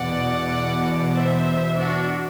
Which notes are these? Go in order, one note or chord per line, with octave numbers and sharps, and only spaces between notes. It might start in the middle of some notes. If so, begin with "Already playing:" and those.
Already playing: E2 B2 D5 F#5
C5 E5
D4 F#4